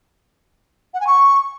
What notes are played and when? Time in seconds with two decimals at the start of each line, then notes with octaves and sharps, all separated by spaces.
0.94 F#5
1.00 G#5
1.06 C#6